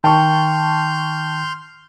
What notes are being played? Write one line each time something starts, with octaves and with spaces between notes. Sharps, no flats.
D#3 G5 A5 C6 C#6 F6 G6